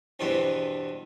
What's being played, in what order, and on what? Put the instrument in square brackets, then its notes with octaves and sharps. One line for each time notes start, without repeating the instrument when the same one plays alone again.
[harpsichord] E2 G2 B2 E3 C4